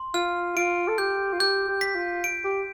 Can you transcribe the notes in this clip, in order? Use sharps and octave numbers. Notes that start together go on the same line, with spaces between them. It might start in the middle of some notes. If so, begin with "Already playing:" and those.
Already playing: C6
F4 F6
F4 D7
A4
G4 G6
F4
G4 G6
G4
B6
F4
D7
G4